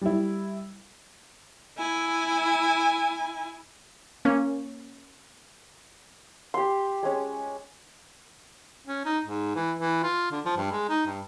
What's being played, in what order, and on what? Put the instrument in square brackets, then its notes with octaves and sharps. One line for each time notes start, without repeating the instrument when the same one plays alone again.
[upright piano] G3 E4
[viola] E4 G#5
[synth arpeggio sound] A#3 C#4
[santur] G4 C6
G#3 C#4
[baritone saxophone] C#4
D#4
G#2
E3
E3
F4
D3
F3
G2
G#3
D#4
G2